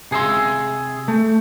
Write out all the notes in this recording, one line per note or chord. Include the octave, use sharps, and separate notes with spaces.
C3 G#4 A4 E5 C6
A3